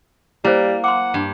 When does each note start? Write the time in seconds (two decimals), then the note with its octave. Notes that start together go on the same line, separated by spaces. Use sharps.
0.45 G3 A#3 E4 C5
0.84 F#5 C6 D6
1.14 G2